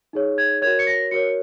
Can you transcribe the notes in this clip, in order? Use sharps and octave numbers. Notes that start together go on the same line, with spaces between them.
D#4 G#4 C#5
G#6
F#4 A#4 C#5 G#6
C#7
A#6
F#4 A#4 C#5 C#7